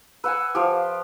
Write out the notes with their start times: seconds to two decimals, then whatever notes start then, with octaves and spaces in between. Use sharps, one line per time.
0.24 B4 F#5 G#5 E6
0.55 F3 G4 F5